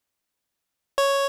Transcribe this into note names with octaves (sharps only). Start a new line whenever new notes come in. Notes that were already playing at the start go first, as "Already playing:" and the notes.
C#5